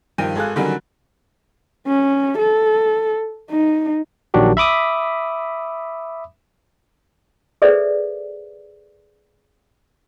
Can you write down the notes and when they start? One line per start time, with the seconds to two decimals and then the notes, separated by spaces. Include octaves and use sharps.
0.18 G2 D#3 F3 G5 D#7
0.35 G#1 G#4 A4 F5 F#6
0.56 D3 D#3 F#3 G3 C#4 F#4
1.87 C#4
2.39 A4
3.51 D#4
4.34 A#1 D#3 F#3 D4 F#4 G4
4.57 E5 B5 D6 D#6
7.62 G#4 A4 B4 C5 D5 E5